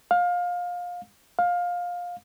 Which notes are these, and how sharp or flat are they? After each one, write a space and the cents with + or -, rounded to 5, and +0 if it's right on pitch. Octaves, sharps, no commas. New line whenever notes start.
F5 +25
F5 +20